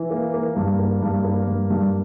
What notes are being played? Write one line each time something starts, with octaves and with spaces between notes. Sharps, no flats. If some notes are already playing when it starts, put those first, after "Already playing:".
Already playing: E3
A#3
A#3
G2
A#3
G2
A#3
G2
G2